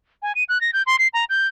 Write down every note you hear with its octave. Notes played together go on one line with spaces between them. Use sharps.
G#5
D#7
F#6
A#6
G6
C6
C7
A#5
G6